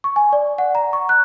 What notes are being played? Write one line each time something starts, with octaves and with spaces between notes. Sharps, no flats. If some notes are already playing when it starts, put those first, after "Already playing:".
C#6
G#5
D5
F#5
A#5
C#6
F#6